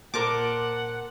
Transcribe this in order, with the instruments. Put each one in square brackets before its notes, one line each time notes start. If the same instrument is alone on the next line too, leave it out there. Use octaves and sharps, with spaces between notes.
[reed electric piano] A#2 [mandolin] A#4 C5 A5 [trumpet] F#5 [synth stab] D6